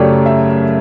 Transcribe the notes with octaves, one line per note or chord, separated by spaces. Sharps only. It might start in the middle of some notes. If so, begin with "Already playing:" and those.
Already playing: F#2 C#3 F#3 A3 G4 A4 C#5 D5
E5